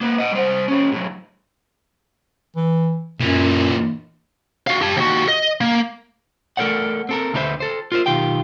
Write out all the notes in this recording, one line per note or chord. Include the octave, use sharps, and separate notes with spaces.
A#3 B4
D#5 F#5
G3 C5
C#4 G4
A2 F#3
E3
F#2 A#2 E3
F#4 F5
G4 A5
D#2 F#4
D#5
A#3
A3 A4 A#4 C5 D5 F#5
C4 A4 A#4
D2 D3 D#4 B4 C5 E5
A4 C5
F4 A#4 C5
B1 D#3 F4 G4 G5